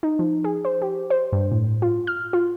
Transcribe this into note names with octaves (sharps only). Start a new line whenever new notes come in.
D#4
F3
G#4
C5
G4
C5
G2
A2
F4
F6
F4